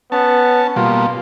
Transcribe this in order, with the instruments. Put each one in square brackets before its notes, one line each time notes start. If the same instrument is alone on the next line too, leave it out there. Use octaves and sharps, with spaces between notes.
[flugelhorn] B3 [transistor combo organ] C#4 A5
[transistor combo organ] B2 G3 A#3 [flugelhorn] F4